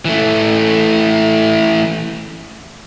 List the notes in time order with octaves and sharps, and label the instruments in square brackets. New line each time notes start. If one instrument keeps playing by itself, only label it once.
[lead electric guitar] E3 A3